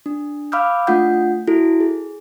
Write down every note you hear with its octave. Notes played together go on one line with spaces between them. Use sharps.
D4
F5 B5 D6 E6 F6 G6
A3 D4 F4 F#5 G6
E4 F#4 A4
G#4